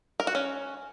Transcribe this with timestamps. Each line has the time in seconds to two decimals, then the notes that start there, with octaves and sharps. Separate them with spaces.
0.20 A#4
0.27 F#4
0.35 C#4